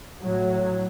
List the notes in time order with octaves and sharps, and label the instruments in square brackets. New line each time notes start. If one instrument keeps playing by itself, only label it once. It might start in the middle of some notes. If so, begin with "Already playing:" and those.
[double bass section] A2 F#3